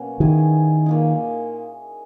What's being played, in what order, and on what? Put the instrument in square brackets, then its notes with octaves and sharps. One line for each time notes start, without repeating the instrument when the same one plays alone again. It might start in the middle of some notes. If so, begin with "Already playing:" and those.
Already playing: [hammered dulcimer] B2 F#3 A#3 C#4
[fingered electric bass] D#3 [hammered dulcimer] E3 B3 D#4 G#4
[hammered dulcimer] A#2 A#3 D#4